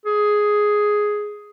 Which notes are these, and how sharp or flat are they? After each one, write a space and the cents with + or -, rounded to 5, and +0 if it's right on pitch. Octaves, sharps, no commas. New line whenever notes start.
G#4 +5